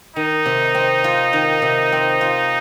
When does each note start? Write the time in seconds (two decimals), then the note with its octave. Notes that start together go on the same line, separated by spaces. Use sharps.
0.16 D#3 D#4
0.46 C3
0.75 C4
1.04 F4
1.33 D#3
1.62 C3
1.92 C4
2.21 F4